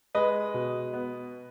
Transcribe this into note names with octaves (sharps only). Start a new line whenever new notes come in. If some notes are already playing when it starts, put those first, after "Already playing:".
G#3 B4 D#5
B2
B3